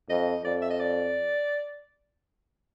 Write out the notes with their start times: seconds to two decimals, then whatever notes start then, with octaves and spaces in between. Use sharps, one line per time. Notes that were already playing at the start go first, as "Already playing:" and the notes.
0.10 F2 D#5
0.45 F2 D5
0.62 E5
0.70 D#5
0.80 D5